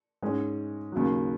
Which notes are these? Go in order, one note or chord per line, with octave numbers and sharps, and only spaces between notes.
G#2 G#3 C#4
D#2 C#3 F#3